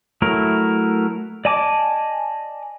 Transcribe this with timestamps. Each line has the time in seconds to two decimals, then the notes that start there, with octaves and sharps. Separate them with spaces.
0.22 F#3 A3 E4 A#4
1.45 D5 D#5 G#5 A5 D6